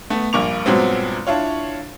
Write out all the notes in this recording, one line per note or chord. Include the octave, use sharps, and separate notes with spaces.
A3 B3
A#1 G2 A#3 C#6 D6 F7
G2 A#2 F#3 G#3 B3 C4
D4 E4 F4 C#5